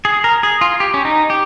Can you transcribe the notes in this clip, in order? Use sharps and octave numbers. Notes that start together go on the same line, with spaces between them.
G#4
A#4
G#4
F4
G4
C#4
D#4
G4